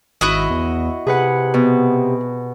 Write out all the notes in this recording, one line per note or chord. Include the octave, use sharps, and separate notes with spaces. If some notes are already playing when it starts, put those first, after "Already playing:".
G#1 E4 F#4 D#5
E2
C3 G#4 B4 F#5
B2